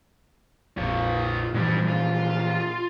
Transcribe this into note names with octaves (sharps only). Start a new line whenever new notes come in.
A#1 F2 F4 C#5
G2 A#2 E3 F3 G3
F4